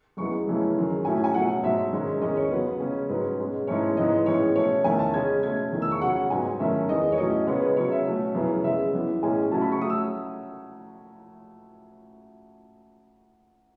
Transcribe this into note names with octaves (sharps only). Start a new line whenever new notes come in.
F#2 E3 G#3 B3 C#6
F#2 C#3 E3 A3 C#4
F#2 D#3 G#3
A2 F#3 A3 C#4 G#5
G#5
B2 F#3 A3 C#4 F#5
G#2 F#3 A3 E5
G#2 D#3 G#3 C#4
E2 D#3 G#3 C#4 D#5
C#5
C#3 F#3 B3 B4
C#3 G#3 C#4
G#2 F#3 C#4 B4
B2 G#3 C#4
G#2 E3 A3 C#4 C#5
G#2 E3 B3 D#5
A2 E3 G#3 C#4 C#5
B2 A3 C#4 C#5
E2 D#3 A3 C#4 G#5
A5
C#3 G#3 C#4 G#6
B2 A3 C#4 G#6
E2 D#3 A3
E6
C#6
C#3 F#3 C#4 F#5
G#2 F#3 B3 G#5
F#2 D#3 A3 C#4 E5
E2 D#3 G#3 B3 D#5
C#5
A2 F#3 A3 C#4 D#5
C#3 G#3 B3 C#5
B4
C#3 F#3 C#4 C#5
E5
B2 F#3 A3 C#4
F#2 C#3 E3 B3
C#3 G#3 B3 E5
F#2 E3 B3
A2 G#3 C#4 G#5
C#3 F#3 A3 C#4 A5
B5
C#6
F#3 A3 C#4 D#6
E6